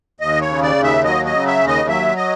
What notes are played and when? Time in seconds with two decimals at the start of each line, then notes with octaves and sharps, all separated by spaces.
0.20 D#2 D#5
0.41 C#5
0.48 C#3
0.62 D5
0.76 D#2
0.83 E5
1.04 F#3 D#5
1.25 D#5
1.32 C#3
1.46 E5
1.61 D#2
1.67 D#5
1.88 F#3 E5
2.16 D#5